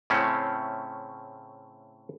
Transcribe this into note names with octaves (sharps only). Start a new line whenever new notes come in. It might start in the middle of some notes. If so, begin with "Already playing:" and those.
A2 C#3 A3 C4 C#4 E4